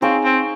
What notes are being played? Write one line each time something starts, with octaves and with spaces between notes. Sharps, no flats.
C4 D#4 G#4 C#5 F5
C4